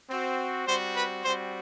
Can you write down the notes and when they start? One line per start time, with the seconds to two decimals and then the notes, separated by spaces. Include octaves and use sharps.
0.10 C4 F#4
0.67 G3 C4 F#4 C5
0.96 B4
1.24 G3 C4 F#4 C5